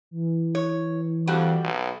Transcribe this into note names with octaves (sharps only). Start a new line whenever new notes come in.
E3
C#5
F2 G3 F#4 G4
B1